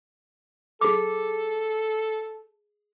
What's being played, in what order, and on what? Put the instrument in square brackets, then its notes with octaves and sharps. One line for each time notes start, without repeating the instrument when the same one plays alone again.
[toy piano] G#4 D6 [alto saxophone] A4